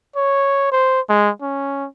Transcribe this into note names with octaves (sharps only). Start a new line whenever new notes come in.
C#5
C5
G#3
C#4